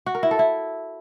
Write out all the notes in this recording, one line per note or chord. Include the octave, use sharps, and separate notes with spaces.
F#4
A#4
E4
A4
E4